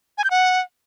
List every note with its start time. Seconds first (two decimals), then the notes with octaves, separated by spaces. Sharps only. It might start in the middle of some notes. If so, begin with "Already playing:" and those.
0.18 G#5
0.24 G6
0.31 F#5